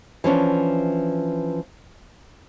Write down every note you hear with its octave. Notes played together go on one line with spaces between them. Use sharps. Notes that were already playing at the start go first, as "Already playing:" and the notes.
E3 F3 C#4 D4